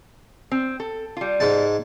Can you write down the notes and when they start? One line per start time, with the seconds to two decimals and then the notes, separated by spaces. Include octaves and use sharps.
0.52 C4
0.80 A4
1.17 G3 F4
1.40 G#2 G#3 A5